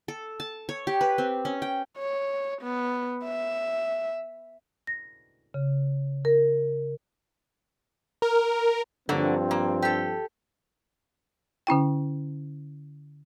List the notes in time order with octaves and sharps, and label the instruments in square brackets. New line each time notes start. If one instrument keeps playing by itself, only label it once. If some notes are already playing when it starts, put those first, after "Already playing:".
[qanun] A4
A5
C#5
G4
B4
C4
C#4
G5
[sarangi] C#5
B3
E5
[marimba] A#6
C#3
A#4
[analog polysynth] A#4
[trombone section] G2 F3 C4 [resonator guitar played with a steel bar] D3 F#3 A#3
[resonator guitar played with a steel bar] A#3
G4 A4
[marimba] D3 C#4 E4 G5